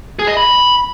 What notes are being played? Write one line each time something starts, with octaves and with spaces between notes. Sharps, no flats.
G#4
D#5
B5